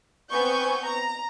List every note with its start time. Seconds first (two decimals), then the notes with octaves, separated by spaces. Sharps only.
0.32 B3 C4 G#5 C#6 G6
0.85 A#5